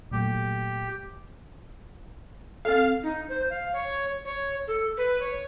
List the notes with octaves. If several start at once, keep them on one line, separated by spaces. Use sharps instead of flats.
A#2 F#3 A3 G4
C4 A4 F5
D#4
C5
F5
C#5
C#5
A4
B4
C#5